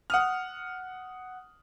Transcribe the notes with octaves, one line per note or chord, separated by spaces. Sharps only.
F#5 D#6 F6